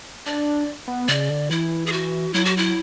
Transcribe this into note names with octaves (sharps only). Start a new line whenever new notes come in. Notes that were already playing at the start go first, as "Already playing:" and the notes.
D4 D5
B3
C#3 D5
D3
E3 E4
G#4
F#4
F#3 E4
F#4
E4